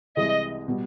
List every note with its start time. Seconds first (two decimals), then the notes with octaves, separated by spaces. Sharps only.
0.17 C2 C3 E3 G#3 D#5
0.68 B2 G3